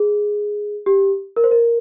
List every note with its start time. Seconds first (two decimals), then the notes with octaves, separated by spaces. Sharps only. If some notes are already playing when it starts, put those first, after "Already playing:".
Already playing: G#4
0.86 G4
1.36 A#4
1.44 C5
1.51 A#4